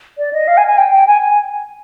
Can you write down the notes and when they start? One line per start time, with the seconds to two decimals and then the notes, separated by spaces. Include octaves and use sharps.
0.18 D5
0.33 D#5
0.48 F5
0.57 G#5
0.67 G#5
0.78 G5
0.92 G5
1.07 G#5
1.22 G#5